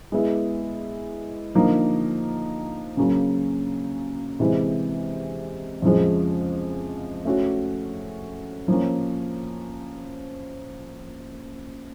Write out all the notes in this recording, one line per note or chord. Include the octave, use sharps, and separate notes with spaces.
G#3 B3 E4
D3 F3 A#3 D#4
C#3 F#3 A#3 C#4
C3 E3 G#3
F2 C#3 F3 G#3
A3 C#4 F#4
F3 A#3 C#4